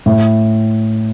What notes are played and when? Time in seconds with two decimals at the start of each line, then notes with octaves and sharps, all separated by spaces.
0.06 A2